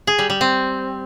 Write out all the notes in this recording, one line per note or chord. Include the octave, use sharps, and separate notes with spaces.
G#4
G3
G3
C4